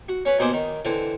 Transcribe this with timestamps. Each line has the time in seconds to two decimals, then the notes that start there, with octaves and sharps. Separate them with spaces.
0.09 F#4
0.25 C#4 B4
0.39 D#2 B2 G#4 C5 D6
0.53 D#3
0.85 D3 E3 C4